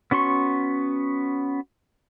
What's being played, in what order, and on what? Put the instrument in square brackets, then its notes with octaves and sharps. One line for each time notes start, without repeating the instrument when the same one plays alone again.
[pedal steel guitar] B3 C#4 F#4 C6 C#6